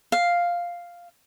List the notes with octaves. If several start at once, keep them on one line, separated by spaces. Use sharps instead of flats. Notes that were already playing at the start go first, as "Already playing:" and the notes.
F5